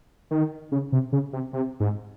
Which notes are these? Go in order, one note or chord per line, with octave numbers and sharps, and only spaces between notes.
D#3
C#3
C3
C#3
C3
C3
G#2